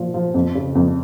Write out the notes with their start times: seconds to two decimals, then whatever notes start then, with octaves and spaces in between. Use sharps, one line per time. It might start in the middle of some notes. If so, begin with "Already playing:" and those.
Already playing: A#2 F3
0.14 F3
0.34 F2
0.55 C#3
0.75 F2